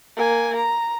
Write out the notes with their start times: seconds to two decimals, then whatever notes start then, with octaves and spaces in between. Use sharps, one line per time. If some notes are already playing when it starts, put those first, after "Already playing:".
0.17 A#3 G#5
0.56 A#5